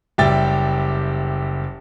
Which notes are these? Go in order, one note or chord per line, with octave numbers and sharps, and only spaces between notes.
F#1 G3 G4 E5 G5 A6